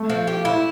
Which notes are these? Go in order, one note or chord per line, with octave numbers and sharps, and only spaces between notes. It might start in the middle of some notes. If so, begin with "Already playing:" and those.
Already playing: A3
F3
G4
E4